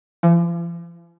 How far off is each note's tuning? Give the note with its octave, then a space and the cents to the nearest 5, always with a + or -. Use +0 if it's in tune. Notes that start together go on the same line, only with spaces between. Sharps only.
F3 -45